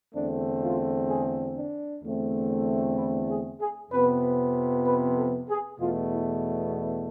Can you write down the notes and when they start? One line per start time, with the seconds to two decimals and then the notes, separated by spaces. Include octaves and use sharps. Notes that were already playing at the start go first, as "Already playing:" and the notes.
0.14 E2 D3 A3 C4 D4
0.62 F4
1.09 G#4
1.56 D4
2.02 E2 D3 A3 C4
2.96 E4
3.29 G#4
3.60 G#4
3.91 F2 C3 F3 B3 B4
4.86 B4
5.17 A4
5.49 G#4
5.80 E2 B2 A3 F4
6.11 E4
6.73 E4